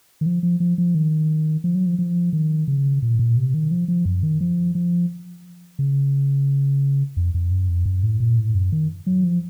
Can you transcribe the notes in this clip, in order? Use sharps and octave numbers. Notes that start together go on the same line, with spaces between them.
D#3
F3
F3
F3
F3
D#3
F3
F#3
F3
F3
D#3
C#3
A#2
A2
A#2
C3
D#3
F3
F3
F#2
D#3
F3
F3
C#3
F2
F2
F#2
F2
F#2
A2
A#2
A2
F#2
D#3
F#3
F3